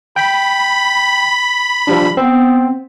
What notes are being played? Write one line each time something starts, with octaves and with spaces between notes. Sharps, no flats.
G5 B5
F3 G3 D4
B3 C4